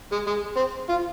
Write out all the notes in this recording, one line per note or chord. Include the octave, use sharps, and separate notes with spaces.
G#3
G#3
C4
F4